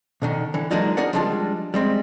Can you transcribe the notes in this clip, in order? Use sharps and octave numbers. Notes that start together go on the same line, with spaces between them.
B2 D3 D#3
D3 E3
F#3 G#3 A#3 D4 D#4 F4
D#4 G#4 A#4 D5 F#5
F3 G3 G#3 D4 D#4 F4
G3 G#3 C4